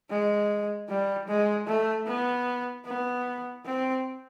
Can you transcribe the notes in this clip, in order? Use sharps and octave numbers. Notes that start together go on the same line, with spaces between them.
G#3
G3
G#3
A3
B3
B3
C4